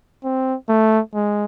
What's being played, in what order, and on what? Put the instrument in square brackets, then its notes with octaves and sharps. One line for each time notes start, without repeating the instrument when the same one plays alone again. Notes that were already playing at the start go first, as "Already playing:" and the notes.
[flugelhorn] C4
A3
G#3